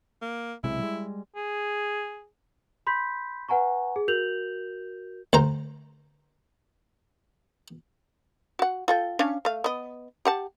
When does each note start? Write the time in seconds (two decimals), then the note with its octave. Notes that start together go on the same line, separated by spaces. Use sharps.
0.22 A#3
0.64 B1 C3 G#3 E4
0.79 G3 G#3
1.36 G#4
2.87 B5 C6 G6 B6
3.49 B4 F#5 G#5 A#5 C#6
3.96 G#4
4.08 F#4 A#4 G6 F7 F#7
5.33 D2 C5 A#5
8.59 F#4 F#5
8.88 F4 A4 G5
9.19 C#4 D4 F5
9.45 A3 F5
9.64 B3 D#5
10.25 G4 F#5 A5